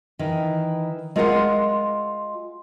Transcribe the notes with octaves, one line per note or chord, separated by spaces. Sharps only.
D#3 E3
G#3 F4 A#4 D5 F#5 G#5